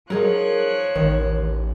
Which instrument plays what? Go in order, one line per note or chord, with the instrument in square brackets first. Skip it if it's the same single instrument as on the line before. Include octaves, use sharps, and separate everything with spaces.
[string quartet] F3 C#5 F#6 [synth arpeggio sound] F#3 [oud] D#4 G#4 A#4
[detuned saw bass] A1 [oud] D#2 [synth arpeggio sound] D#3